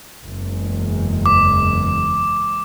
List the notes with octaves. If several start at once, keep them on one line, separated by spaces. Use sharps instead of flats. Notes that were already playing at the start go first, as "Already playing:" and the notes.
F#1 E2 G#3
D6